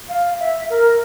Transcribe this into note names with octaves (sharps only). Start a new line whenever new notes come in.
F5
E5
A#4